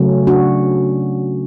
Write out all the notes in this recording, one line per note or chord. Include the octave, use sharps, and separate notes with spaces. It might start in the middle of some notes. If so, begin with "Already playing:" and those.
Already playing: C#3 F#3 A3 C#4
D4 F#4